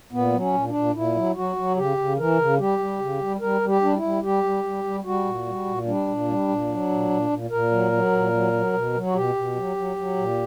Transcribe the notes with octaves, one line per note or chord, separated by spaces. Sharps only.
A#2 B3
F#3
C#4
A#2
D4
A#2
A#2 E4
F#3
F#3 F#4
F#3
C#3 G4
C#3
E3 A#4
C#3
G3 G4
G3
C#3
G3
G3 A#4
G3
G4
G3 D4
E4
G3
G3 G4
G3
G3
G3
G3 F#4
A#2
G3
A#2
G3 D4
A#2
G3
A#2
F#3
A#2
A#2
A#2
A#2 A#4
F#3
F#3
A#2
F#3
F#3
B2
F#3
F#4
B2 G4
B2
F#3
F#3
F#3
A#2